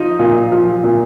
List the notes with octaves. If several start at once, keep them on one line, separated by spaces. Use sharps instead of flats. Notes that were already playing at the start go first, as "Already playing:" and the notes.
Already playing: F3 D#4
A#2
F3
A#2